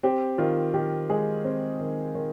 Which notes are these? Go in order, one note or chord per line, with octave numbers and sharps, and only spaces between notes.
C4 G4
D#3 F4
D#3 G4
G#3 G#4
C4
D#3
D#3